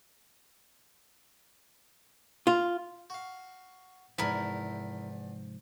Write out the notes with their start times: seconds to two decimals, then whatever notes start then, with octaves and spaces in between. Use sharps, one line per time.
2.47 F4
3.10 F#4 F5
4.18 E2 G#2 C3 F3 D4 E4 A#4